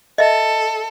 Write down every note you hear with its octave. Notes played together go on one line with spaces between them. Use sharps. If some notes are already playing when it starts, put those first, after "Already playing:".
A4 D#5 E5